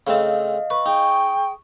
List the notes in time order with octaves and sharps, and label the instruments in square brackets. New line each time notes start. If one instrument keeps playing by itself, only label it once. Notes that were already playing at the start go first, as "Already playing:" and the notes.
[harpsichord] C#3 A3 C4 [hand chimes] D#5 F5
[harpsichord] B4 [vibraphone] C#6
[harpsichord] D#4 [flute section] G#4 G5